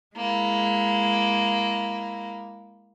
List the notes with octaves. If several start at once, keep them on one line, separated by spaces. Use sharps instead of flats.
G#3 A#3 E4